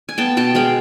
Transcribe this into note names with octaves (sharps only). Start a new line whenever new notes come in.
G#5
B3 G5 A5
B2 G5 A5
G#3 F5 G5